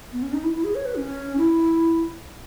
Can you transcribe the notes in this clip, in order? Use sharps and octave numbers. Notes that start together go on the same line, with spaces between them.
B3
C#4
D#4
E4
E4
G#4
C#5
B4
C#4
E4